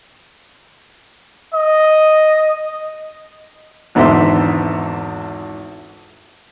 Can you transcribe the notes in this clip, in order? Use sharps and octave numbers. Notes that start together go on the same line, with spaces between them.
D#5
G#1 E2 G#2 D3 E5 C6